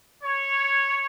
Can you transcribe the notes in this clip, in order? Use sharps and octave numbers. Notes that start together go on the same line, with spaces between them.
C#5